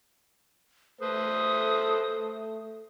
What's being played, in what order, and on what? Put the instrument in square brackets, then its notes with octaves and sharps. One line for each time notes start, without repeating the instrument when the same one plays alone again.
[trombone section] A3 [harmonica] A4 B4 C5 [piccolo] D#6